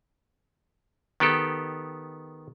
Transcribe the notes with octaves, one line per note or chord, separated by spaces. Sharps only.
D#3 B3 G4 A4